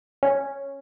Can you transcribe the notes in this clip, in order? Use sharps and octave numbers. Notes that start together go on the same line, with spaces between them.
C#4